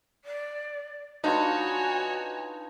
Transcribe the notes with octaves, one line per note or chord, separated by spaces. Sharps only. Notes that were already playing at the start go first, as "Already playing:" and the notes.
D5
D4 D#4 F4 F#4 B4 C#5 G#5